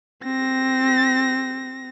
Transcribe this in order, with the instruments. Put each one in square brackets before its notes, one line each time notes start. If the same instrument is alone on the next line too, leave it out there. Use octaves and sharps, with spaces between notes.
[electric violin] C4 A#6